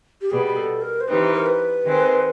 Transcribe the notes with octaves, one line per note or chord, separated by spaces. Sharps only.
G4
B2 G3 B3 G#4
G#4
A4
A#4
C5
E3 G3 C4 D#4 B4
A#4
B4
D#3 G#3 C4